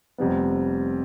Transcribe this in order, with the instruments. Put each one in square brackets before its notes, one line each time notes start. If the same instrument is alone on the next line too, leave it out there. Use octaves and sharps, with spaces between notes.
[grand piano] F1 F2 C3 G3 B3